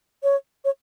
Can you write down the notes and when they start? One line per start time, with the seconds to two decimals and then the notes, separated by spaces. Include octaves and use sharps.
0.23 C#5
0.65 C#5